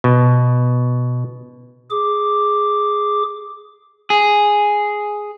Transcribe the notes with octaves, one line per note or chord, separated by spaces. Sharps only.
B2
G#4 D6
G#4